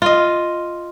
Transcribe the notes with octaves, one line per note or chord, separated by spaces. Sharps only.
F4 D#5